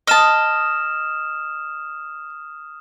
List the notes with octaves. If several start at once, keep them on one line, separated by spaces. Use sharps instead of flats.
D#5 A5 D#6 F6 E7